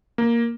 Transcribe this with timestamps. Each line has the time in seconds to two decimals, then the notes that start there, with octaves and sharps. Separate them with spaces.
0.18 A#3